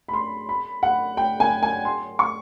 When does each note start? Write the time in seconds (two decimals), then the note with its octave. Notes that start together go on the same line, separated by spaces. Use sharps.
0.08 B5
0.14 C6
0.49 B5
0.83 F#5
1.17 G5
1.40 G#5
1.63 G#5
1.85 C6
2.19 C#6